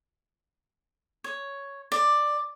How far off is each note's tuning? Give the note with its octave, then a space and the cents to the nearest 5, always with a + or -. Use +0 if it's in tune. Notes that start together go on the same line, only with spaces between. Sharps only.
C#5 +5
D5 +10